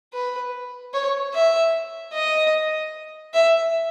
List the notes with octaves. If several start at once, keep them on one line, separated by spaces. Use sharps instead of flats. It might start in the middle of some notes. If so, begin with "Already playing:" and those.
B4
C#5
E5
D#5
E5